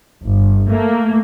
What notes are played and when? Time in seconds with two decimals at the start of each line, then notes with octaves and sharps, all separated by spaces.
0.23 G1
0.71 A3 A#3